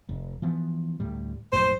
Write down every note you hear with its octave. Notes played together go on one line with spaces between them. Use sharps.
F1
E3 F3 B3
D2 A2 G3
A#1 F#2 A2 C5